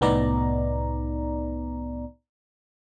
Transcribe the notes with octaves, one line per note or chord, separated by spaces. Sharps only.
C2 A2 B3 D#4 D5 A#5